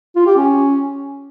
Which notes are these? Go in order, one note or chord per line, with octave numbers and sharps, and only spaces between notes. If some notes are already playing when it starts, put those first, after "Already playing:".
F4
G4
C#4